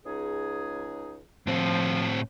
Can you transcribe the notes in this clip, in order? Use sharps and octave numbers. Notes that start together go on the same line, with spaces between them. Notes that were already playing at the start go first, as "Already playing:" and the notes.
C#2 D#4 G#4
A2 F3 C4